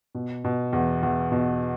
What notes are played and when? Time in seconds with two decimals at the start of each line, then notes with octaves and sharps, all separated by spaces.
0.15 B2
0.44 B2
0.73 E2
1.03 E2
1.32 B2